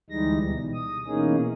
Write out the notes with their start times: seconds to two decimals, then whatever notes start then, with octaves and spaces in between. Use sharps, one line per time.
0.10 D2 E3 G3 G#3 D#4 A#6
0.42 B2
0.74 D#6
1.07 B2 E3 A#3 C#4 D#4 G#4